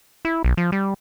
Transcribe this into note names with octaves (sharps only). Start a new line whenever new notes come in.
E4
B1
F3
G3